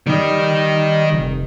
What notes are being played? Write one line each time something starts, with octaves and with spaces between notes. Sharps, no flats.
D#3 G3 D#4
F1